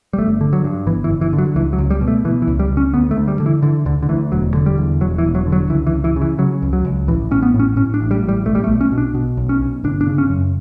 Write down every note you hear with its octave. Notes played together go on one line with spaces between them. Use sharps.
G3
G1 A3
D3
F#3
G2
G1 E3
E3
G1
E3
D3
F#3
C#2 E3
F#3
C#2
G3
B2
A3
B2 E3
E3
C#2
G3
C#2
C#4
D2 B3
A3
D2
G3
D3
E3
D3 E3
D2 D3
D3
D2 E3
E1 F#3
D3
G3
E2
E1 F#3
E3
E1
F#3
D3
F#3
C#2 E3
E3
C#2
E3
C#3
E3
C#3 F#3
C#2
F#3
C#2
A1 E3
A1 C#4
B3
A2
C#4
A2 C#4
D4
A1
G3
A1
G3
B1 A3
G3
A3
B1
C#4
B2
D4
B2
B1
C#4
B1
G1 D4
D4
C#3
C#4
F#2